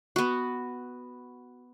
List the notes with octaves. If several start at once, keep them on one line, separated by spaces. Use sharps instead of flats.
B3 F#4